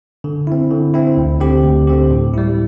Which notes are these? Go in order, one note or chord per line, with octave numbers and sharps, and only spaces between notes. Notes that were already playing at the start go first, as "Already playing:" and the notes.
D3
C4 E4
D3
C4 E4
D2
D3 C4 G4
D2
D3 C4 G4
A2
G3 E4